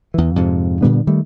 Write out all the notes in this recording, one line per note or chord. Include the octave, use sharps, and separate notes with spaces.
E2 E3
F2 G#2 C3
A#2 D3 G3 B3
D#3 G3 A3